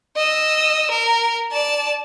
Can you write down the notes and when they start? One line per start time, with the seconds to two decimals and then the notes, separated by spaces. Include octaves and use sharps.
0.17 D#5 E6
0.91 A#4
1.52 D5 A5